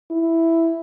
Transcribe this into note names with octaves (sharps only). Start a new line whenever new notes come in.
E4